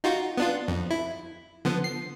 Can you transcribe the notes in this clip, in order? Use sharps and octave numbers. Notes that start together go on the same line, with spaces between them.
D#4 F4 F#4
B3 D4 F4
F2
E4
D3 F3 B3
C7